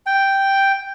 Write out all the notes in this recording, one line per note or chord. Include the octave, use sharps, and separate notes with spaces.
G5